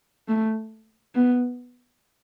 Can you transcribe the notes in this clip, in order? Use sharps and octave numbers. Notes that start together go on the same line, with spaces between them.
A3
B3